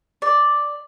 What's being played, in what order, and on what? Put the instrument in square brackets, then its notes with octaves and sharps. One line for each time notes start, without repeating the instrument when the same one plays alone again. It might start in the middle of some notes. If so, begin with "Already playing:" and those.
[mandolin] D5